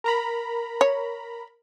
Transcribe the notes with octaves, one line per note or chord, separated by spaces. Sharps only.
A#4 A#5 B5
C#5